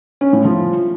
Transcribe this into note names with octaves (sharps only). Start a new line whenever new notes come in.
C#4
A2
F3